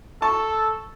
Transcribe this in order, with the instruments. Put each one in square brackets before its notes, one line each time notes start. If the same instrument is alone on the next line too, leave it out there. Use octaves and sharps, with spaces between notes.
[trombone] A4 [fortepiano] A5 C#6